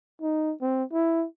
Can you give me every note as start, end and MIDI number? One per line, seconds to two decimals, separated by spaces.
0.22 0.54 63
0.61 0.83 60
0.93 1.26 64